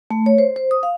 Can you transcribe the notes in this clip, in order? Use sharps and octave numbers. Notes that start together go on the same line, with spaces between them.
A3
C#5
C5
C5
D#6
F5